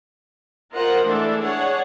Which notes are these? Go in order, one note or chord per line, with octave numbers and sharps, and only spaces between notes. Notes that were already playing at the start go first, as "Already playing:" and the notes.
F4 A#4 C5 D#5 F#5
E3 G#3 A3 D4 A4 E5
D4 G#4 C#5 F#5